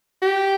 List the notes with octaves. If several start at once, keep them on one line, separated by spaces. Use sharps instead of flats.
G4